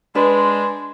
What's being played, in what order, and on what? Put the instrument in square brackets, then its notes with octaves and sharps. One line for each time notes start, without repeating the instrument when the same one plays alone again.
[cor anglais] G#3 [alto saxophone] D4 [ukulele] B4 [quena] C6